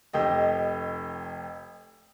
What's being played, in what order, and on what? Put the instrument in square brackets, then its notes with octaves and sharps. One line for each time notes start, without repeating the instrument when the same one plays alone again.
[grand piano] F1 G4 D#5